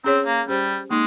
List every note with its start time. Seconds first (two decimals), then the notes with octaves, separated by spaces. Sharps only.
0.04 C4 C#4 G#4 C#5
0.26 A#3
0.48 G3 C#4 G4 C5
0.90 G#3 A#3 D#4